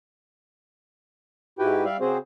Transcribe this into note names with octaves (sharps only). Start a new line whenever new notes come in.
G#2 E4 F#4 G4 B4 G5
G3 D5 E5 F5
C#3 C4 F#4 G#4 C5